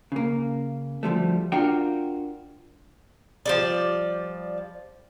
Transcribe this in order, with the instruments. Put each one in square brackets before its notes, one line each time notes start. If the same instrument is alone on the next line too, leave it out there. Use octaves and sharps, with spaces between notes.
[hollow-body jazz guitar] C#3 A#3
D2 F3 G3 A3
D4 F4 F#4 A#4 F5 G5
[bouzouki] F3 G3 D5